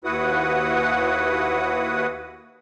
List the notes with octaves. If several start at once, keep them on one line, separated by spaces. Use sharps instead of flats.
D#2 E4 F#4 B4 F#5 D#6